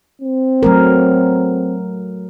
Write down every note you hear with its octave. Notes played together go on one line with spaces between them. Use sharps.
C4
F#3 A3 A#4